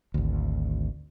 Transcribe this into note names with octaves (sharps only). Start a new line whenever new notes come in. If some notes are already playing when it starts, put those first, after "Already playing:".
G#1 D2